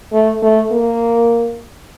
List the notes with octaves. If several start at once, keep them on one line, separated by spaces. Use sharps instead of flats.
A3
A3
A#3